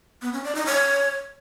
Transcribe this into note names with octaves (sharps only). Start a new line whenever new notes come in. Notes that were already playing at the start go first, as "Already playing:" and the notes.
B3
C#4
D5
D#4
C#5